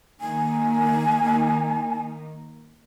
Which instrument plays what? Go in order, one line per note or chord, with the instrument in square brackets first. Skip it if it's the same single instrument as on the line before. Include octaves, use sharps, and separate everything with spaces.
[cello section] D#3 A#3 D#4 [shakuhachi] G#5